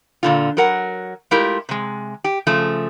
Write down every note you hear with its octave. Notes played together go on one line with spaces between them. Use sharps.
A#2 D3 F4
F#3 A#4 F#5
G#3 A3 E4 F4 G4 A#4
C3 G#3
G4
C#3 F3 A3